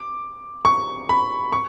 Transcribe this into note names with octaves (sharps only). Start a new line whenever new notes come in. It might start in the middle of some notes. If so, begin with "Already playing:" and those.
Already playing: D6
C#6
B5
C#6